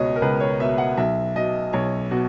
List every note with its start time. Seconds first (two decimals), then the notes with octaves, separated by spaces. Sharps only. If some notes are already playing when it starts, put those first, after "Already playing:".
Already playing: C#2 B2 C#5 D#5
0.16 A#4
0.22 C#2 B4
0.40 C#5
0.59 B2 E5
0.78 F#5
0.97 B1 E5
1.36 B2 D#5
1.73 B1 C#5
2.11 B2 F#4